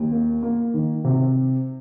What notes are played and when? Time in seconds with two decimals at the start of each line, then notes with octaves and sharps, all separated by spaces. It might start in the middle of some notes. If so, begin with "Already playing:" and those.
Already playing: D#2
0.11 A#3
0.43 A#3
0.74 D#3
1.04 C3